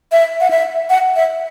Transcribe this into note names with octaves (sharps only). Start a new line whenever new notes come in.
E5
F#5
E5
F#5
E5